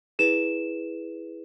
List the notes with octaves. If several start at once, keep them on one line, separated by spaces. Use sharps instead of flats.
E4 G#4 B4 E7